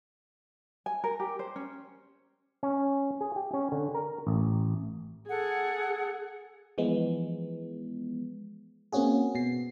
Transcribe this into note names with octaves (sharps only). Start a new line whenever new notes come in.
G#5
A#4
G4
C5
C#4
C#4
G#4
G4
C#4
D3
A#4
A1
G#4 A4 F#5
E3 F3 G#3 B3
A#3 C4 C#4 F#4 G#4
B2 C7